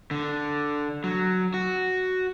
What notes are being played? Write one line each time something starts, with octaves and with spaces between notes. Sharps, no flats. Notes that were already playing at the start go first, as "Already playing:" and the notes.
D3
F#3
F#4